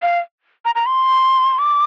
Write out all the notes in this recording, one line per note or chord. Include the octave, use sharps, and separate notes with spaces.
F5
A#5
A#5
C6
D6